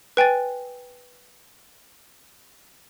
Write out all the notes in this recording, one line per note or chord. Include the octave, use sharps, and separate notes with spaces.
B4 G5 G#5 A6